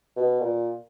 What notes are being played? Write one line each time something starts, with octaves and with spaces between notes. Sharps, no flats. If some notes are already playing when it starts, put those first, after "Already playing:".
B2
A#2